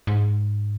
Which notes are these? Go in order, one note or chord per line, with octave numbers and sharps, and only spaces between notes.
G#2